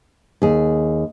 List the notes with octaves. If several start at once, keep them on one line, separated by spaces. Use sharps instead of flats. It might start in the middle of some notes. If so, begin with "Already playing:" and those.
D#2 G#4